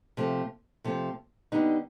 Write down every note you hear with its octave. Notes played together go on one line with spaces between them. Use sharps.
C3 F3 A3
C3 F3 A3
D3 G3 B3 D#4